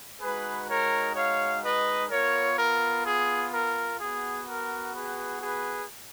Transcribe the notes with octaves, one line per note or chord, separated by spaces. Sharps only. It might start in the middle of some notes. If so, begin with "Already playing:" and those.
G#3 D#4 F#4 G#4 B4
A#4 C#5
C#5 F5
B4 D#5
B3 F4 A#4 C#5
A#4
G#4
A#4
B3 F#4 G#4
A#4
G#4 B4
G#4 B4